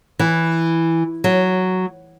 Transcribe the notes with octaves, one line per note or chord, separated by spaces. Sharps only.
E3
F#3